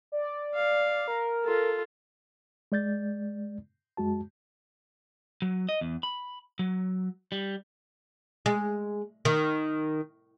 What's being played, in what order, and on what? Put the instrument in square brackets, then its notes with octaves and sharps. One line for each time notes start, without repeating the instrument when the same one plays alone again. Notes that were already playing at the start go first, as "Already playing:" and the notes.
[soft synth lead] D5
[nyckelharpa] F5
[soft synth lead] A#4
[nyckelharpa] F4 A4
[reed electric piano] G#3 D5 G6 A6
F#2 G#3 F#4 A5
[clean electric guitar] F#3
D#5
E2
B5
F#3
G3
[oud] G#3
D#3